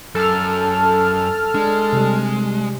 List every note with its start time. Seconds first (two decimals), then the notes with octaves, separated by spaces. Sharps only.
0.15 F#2 A4 A5 F6
1.55 G#3 D4
1.93 C3 G3